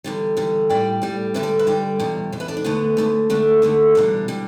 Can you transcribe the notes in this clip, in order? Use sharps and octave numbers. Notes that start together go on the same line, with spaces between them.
E2 D3 G3
E2 D3 G3
A2 G3 D5 G5
A2 G3
G2 D3 G3 B4 E5
A4 D5
B4 E5
G2 D3 G3 D5 G5
E2 B2 G3
E2 B2
B4 E5
A4 D5
D4
D2 D3 A3 B3
D2 D3 A3
D2 D3 A3 D4
D2 D3 A3
E2 B2 G3 D4
B2 G3